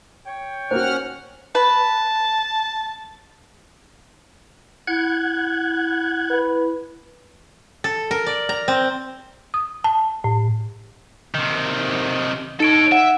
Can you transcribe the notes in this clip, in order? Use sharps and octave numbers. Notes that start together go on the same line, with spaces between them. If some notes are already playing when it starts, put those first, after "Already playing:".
C#5 G5
A#3 C#4 F#4 C5 F#5 F6
B4 A5
E4 F#5 F#6 G#6
B4
A4
A#4
D5
A#5
C4
D#6
A5
A2
C3 D#3
D#4 A4 C#5 D7
E5 F#5